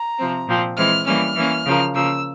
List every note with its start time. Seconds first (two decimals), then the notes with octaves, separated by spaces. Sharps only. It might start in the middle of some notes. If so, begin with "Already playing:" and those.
Already playing: A#5
0.19 C3 F3 C4
0.48 A#2 F3 C4
0.77 E3 G#3 C4 F6
1.06 E3 G3 A#3 C#4 F6
1.36 E3 A#3 C#4
1.65 C#3 F3 A#3
1.94 C#3 F3 A#3 E6